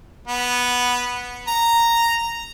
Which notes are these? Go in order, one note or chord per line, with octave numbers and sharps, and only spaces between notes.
B3
A#5